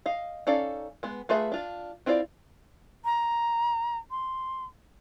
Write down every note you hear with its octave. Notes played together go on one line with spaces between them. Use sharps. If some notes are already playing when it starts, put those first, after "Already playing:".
D#5 F5
C#4 D#4 A4 D5 F5
G#3 B3
A3 F4 G#4 B4 E5
D4 F4
C4 E4 F4 B4 D5
A#5
C6